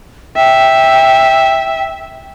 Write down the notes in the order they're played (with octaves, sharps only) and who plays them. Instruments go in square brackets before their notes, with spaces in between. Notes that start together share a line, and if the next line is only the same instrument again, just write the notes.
[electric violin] E5 [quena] G5